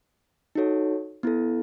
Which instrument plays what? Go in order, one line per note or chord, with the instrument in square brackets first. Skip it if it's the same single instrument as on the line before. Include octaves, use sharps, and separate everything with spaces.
[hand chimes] D#4 F#4 A4 C#5
B3 E4 A4